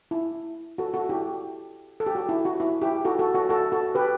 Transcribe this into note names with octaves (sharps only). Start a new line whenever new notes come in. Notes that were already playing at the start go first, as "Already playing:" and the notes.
E4
F#4 A4
F#4 A4
E4 G4
A4
G4
F#4
E4
F#4
E4
E4 G4
F#4 A4
F#4 A4
F#4 A4
F#4 A4
F#4 A4
G4 B4